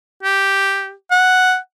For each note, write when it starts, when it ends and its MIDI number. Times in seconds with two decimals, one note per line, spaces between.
0.23 0.92 67
1.11 1.56 78